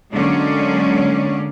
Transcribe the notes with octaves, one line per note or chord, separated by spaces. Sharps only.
D3 F#3 G#3 A#3 C#4 D5